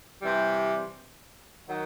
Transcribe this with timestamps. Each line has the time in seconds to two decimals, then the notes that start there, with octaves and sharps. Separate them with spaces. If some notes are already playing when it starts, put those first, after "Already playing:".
0.22 C3 E3 G3
1.69 D#3 F#3